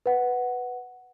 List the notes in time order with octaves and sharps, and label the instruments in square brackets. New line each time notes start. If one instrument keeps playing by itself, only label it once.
[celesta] B4 F#5